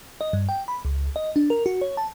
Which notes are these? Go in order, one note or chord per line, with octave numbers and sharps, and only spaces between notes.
D#5
G2
G5
B5
C#2
D#5
D4
A#4
F#4
C#5
A5